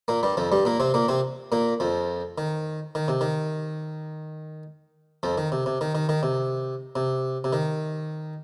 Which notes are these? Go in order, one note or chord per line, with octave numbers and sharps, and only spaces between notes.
A#2 A#3
G2 G3
F2 F3
G2 G3
A#2 A#3
C3 C4
A#2 A#3
C3 C4
A#2 A#3
F2 F3
D#3
D#3
C3
D#3
F2 F3
D#3
C3
C3
D#3
D#3
D#3
C3
C3
C3
D#3